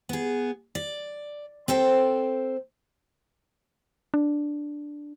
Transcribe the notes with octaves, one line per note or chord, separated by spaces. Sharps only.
B3 G#4
D5
C4 A4 C5 G5
D4